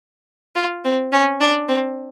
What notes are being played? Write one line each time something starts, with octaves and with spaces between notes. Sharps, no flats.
F4
C4
C#4
D4
C4